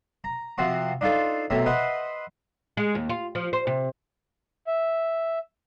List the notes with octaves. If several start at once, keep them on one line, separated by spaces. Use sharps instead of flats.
A#5
C3 F3 C4 F#4 C#6
D4 D#4 F4 A4 C5
B1 C3 A3 C#4 E5 A#5
B4 C5 D#5 E5 F#5
G#3
D#2
F4
F3
C5
C3
E5